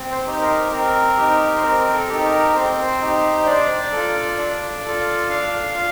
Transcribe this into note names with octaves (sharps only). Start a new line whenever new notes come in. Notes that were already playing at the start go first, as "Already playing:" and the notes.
Already playing: C4
C5
D#4 G4
A#4
C4 A#4
D#4 G4
C5
C4 A#4
A4
D#4 G4
A#4
C4 C5
D#4 G4
D4 D5
F4 A4
D4
F4 A4
D4 F5
F4